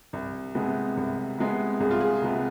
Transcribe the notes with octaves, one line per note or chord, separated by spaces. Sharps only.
C2
C3 G#3 B3
C2
C3 G#3 B3
C2 G#4
F4
G#4
C3 G#3 B3